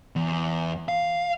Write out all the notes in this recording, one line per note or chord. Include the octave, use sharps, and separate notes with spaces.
E2
F5